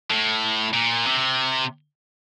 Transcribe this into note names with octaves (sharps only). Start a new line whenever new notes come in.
A2
A#2
C3